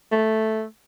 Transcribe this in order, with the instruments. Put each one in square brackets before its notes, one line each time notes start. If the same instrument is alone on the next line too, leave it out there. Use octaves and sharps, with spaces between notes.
[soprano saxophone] A3